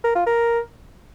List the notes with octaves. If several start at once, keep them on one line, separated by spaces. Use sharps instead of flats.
A#4
F4
A#4